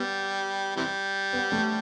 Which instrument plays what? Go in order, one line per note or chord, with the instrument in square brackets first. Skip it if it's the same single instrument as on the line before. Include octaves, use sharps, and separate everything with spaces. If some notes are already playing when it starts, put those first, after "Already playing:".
Already playing: [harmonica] G3 [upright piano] B3
[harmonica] C3 E3 G3
[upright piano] B3
A3